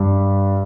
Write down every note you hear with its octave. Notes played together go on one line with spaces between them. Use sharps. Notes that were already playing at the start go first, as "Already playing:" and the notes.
Already playing: G2 G3